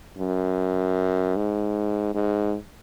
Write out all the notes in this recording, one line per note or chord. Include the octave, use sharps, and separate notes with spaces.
F#2
G#2
G#2